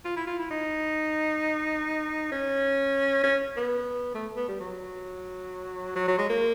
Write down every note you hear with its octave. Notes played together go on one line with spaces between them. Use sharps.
F4
E4
F4
E4
D#4
C#4
C#4
B3
A3
B3
G3
F#3
F#3
F#3
G#3
A#3